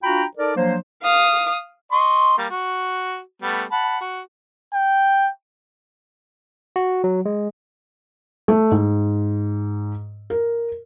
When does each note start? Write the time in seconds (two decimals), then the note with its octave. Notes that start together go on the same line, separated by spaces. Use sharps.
0.03 D4 F4 F#4 G5 A#5 B5
0.37 D#4 A4 A#4 D5
0.56 F3 F#3 A#3 D4 C5
1.02 F5 D#6
1.92 D#5 C6 C#6
2.38 G3 A#3
2.50 F#4
3.42 G3 A3 B3
3.72 F#5 A5 B5
4.01 F#4
4.74 G5
6.76 F#4
7.04 F#3
7.25 G#3
8.48 A3
8.71 G#2
10.30 A#4